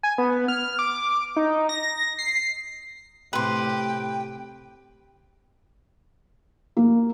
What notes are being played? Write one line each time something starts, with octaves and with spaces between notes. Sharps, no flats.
G#5
B3
F6
D6
D#4
A#6
C7
A2 C3 G4 B4 G5 C6
A#3